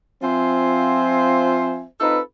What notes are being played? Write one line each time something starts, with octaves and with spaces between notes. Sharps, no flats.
F3 C4 F4 C5 E5 G#5
C4 D#4 F4 A4 B4